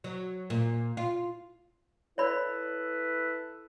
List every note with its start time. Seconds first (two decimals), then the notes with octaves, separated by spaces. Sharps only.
0.04 F#3
0.50 A#2
0.97 F4
2.18 E4 A4 B4 C#5 D5 B5